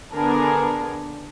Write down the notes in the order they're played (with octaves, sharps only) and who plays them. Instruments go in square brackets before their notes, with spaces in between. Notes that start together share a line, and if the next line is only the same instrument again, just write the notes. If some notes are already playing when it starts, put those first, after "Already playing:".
[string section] D3 B3 D4 G#4 A#4